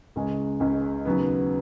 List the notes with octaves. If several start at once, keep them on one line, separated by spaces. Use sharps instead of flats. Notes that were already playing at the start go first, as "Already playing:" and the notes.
C#2 C#3 G#3 C#4
C#2 C#3 G#3 C#4
D#2 C#3 F#3 B3